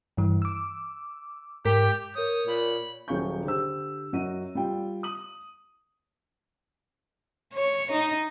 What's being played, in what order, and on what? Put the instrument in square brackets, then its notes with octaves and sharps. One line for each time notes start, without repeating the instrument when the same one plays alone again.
[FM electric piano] G2 E3
D6 E6
[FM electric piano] G#2 A#4 B6 [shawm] G4
[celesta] A#4 G6 [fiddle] C#5 [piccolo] D#6
[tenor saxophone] A#2 [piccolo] B5
[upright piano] D#1 F#3 G#4 F5 C#6 G6
D3 G4 C5 E6
F#2 F#3 F#4 D#5 D#7
G3 F4 G5
D#6 F#7
[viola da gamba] C#5
D#4